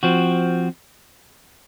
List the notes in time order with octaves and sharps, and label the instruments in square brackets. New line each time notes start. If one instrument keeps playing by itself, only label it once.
[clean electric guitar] F3 C4 F#4